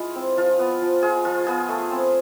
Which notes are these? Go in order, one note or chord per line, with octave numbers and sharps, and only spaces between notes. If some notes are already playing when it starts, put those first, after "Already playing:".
Already playing: G#3 E4 F4 G#4
C4
F3 F4
B3
F3
F4 G#4
F3 F4
B3 G#4
A3
C4